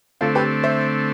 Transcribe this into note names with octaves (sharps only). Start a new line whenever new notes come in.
D3 A3 C4 F4 A4
G4 B4
C5 E5